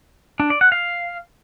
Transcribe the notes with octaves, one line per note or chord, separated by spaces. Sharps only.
D4
D5
F#5
F5